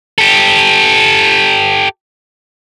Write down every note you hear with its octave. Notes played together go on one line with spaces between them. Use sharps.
G4 A4